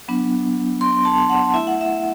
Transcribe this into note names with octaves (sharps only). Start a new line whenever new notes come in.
F#3 B3 D4
C6
A5
F#5
A3 E4 E5
F#5
E5